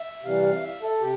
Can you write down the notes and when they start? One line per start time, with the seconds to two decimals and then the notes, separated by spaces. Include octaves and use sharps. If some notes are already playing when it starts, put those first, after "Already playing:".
Already playing: E5
0.23 C3 E3 G3 F5
0.43 F5
0.62 E5
0.82 A4
1.01 C3 G4